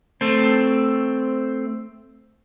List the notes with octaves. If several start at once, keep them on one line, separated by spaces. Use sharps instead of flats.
A3 C4